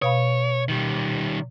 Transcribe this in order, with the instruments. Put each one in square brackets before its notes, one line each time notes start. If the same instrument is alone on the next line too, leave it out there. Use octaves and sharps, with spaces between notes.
[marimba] B2 F5 B5 [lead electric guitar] C#5
[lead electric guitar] D#3 G3